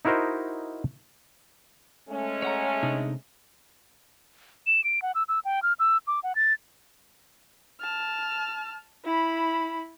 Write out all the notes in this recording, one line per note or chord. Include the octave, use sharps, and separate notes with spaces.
D#4 E4 F#4 A#4 C5 D#5
G#3 A3 C#4
C#5 F#5 A#5
C3 D4 D#4
E7
D7
F#5
E6
E6
G5
F6
E6
D6
F#5
A6
A5 F6
E4 B5